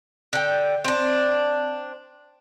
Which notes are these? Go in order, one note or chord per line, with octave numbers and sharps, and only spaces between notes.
D3 G5
C4 D4